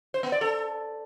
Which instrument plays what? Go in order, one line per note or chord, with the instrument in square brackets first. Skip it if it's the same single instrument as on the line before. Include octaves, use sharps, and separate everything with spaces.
[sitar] C5
B3
D5
A4